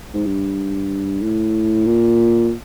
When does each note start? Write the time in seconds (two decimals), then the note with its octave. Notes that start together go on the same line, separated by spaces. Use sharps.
0.14 G#2
0.26 G2
1.22 A2
1.86 A#2